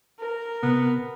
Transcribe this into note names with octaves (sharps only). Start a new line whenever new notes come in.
A#4
C3 B3